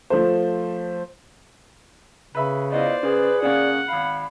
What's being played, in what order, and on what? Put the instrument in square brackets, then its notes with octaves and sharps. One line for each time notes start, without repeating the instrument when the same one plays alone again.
[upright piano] F3 A3 C5
[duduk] C#3 [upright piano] B4 E5 B5
[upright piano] B3 E4 F4 [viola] C5 D5 [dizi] D#5
[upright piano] C#3 [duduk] G#4 [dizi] B4
[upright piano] C#3 A#3 C#4 [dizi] D5 [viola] F#5
[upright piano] G#1 F5 [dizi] B5